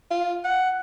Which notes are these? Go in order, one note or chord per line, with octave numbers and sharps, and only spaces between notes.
F4
F#5